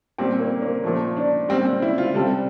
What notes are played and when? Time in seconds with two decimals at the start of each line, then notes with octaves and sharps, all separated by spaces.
0.18 A#2 G3 C4
0.40 A#3
0.62 A#3
0.84 A#2 F3 A3
1.17 D4
1.49 A#2 G3 C4
1.65 C4
1.82 E4
1.98 F4
2.14 C3 G3 A4